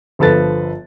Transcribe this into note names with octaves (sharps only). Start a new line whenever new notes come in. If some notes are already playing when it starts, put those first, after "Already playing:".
G1 F3 A4 B4 A6